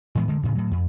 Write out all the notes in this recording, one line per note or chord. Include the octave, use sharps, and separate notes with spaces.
A2 E3 G#3 B3
D3 G#3
D2 A2 C#3
A2 F#3
F2